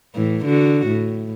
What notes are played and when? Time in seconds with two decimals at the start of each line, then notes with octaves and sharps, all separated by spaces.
0.15 A2 E3
0.45 D3 F#4
0.86 A2